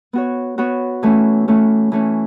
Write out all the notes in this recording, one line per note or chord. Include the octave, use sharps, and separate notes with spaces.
B3 F#4 C#5
B3 F#4 C#5
E3 A3 C#4
E3 A3 C#4
E3 A3 C#4